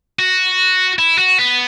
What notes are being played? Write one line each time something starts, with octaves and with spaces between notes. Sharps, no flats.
F#4
E4
F#4
B3